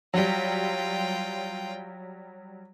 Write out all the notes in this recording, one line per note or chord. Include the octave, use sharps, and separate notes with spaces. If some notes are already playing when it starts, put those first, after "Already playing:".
F#3 G3 F4 G5